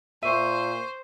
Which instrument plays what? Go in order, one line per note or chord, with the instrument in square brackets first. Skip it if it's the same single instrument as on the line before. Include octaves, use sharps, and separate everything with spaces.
[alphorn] A#2 [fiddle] C5 [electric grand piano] E5 [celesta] C#6 D#7